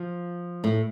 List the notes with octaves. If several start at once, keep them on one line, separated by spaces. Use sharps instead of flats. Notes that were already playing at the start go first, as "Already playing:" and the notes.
Already playing: F3
A2